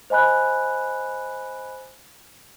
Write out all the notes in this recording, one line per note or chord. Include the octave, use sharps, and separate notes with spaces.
C5 D#5 G#5 B5 F#6